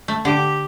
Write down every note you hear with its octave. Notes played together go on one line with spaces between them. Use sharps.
A3
D3 G4